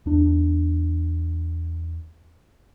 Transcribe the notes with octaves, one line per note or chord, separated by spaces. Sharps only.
E2 D4